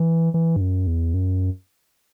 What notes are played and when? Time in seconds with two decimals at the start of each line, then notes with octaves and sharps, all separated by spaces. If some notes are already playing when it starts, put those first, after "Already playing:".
Already playing: E3
0.34 E3
0.56 G2
0.61 F#2
0.87 E2
1.14 F#2